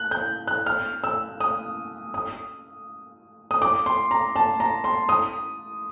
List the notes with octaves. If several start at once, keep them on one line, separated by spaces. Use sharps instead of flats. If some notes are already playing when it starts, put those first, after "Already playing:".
Already playing: F#6
G6
F#6
F6
E6
D#6
D#6
D#6
D6
C6
A#5
A5
A#5
C6
D#6